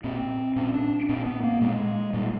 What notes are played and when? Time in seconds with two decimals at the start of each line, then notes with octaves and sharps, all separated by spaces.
0.04 A#2 C4
0.56 A#2 C#4
0.74 D4
1.09 A#2 C4
1.26 B3
1.43 A#3
1.61 A#2 G#3
2.13 A#2 G3